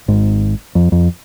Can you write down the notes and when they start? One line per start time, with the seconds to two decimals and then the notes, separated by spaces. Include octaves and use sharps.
0.08 G#1 G#2
0.75 F2
0.92 F2